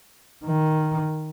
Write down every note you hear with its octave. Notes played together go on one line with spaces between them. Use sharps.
D#3